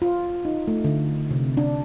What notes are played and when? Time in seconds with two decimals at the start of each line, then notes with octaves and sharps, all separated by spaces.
0.02 F4
0.45 D#4
0.68 A3
0.85 D3
1.31 C3
1.57 D4